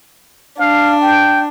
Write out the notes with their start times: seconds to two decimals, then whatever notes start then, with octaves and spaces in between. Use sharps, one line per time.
0.59 D4 F5
1.02 G5